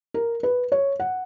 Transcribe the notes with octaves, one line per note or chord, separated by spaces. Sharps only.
A#4
B4
C#5
F#5